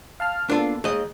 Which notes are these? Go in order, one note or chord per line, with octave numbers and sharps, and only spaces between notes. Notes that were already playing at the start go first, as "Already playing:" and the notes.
F5 A5 F6
A#3 B3 D4 F4 A4
D#2 G#3 D#5